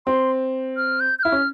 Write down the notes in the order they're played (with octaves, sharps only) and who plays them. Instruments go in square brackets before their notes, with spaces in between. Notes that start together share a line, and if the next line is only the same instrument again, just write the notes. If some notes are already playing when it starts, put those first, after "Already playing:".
[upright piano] C4 [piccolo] C6
[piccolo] F6
G6
G6
[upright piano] E4 [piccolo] F6
[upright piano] C#4